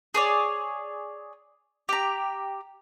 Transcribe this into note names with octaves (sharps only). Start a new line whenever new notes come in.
G#4 C#5 D5
G4 A#5